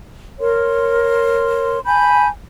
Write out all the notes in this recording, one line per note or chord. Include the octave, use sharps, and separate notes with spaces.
A#4 C#5 C6
G#5 A5 B5 G6